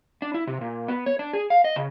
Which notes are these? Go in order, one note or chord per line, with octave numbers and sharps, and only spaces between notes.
D4
E4
C3
A#2
B3
C#5
D4
G#4
F5
D#5
C#3